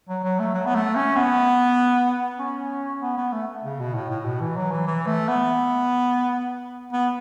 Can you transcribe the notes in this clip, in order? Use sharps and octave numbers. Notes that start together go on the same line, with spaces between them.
F#3
F#3
A3
F#3
B3
A3
C#4
B3
C#4
B3
B3
A3
C#3
B2
A2
A2
B2
E3
F#3
E3
E3
A3
B3
B3